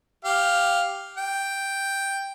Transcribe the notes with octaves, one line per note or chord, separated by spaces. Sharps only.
G4 F5
G5